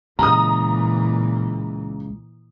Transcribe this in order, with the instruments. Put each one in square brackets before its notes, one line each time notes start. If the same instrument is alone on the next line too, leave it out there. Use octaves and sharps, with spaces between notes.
[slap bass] C#2 [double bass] A#2 E3 [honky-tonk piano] A#5 D#6